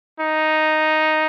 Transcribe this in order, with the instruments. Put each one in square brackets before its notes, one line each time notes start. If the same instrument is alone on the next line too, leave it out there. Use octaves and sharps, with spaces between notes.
[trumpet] D#4